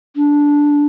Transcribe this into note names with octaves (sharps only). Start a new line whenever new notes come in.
D4